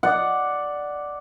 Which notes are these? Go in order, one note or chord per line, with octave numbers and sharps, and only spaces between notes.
D5 F#5